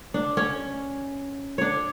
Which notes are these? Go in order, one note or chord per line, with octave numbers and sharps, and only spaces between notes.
D4
C#4
D4 C#5